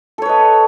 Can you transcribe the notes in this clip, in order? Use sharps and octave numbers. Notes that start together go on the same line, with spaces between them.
A4 B4 C#5 D#5